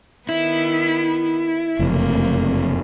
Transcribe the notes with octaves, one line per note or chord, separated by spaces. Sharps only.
D#3 B3 E4
F#1 F2 C3 A3 A#3